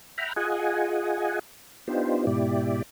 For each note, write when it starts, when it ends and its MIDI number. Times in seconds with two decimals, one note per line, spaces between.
0.18 0.33 76
0.18 0.33 78
0.18 0.33 79
0.18 0.33 82
0.18 0.33 83
0.18 0.33 89
0.36 1.39 65
0.36 1.39 68
0.36 1.39 75
0.36 1.39 78
0.36 1.39 80
1.88 2.26 59
1.88 2.26 62
1.88 2.26 63
1.88 2.26 65
1.88 2.26 67
1.88 2.26 72
2.27 2.82 44
2.27 2.82 47
2.27 2.82 64
2.27 2.82 67
2.27 2.82 74